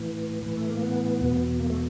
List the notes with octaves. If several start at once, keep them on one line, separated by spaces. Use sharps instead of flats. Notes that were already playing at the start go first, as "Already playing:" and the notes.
Already playing: A2 E3
A2 E3
A3
A#3
B3
E2 B2
A#3
A3